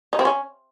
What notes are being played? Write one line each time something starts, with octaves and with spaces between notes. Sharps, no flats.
D#4
C4
C#4